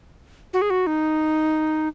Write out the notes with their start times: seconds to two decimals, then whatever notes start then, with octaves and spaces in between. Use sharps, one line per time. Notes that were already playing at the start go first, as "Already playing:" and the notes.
0.53 F#4
0.62 G#4
0.70 F#4
0.87 D#4